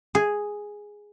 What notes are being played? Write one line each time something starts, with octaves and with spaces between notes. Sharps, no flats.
G#4